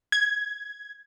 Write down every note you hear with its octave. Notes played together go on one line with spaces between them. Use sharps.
G#6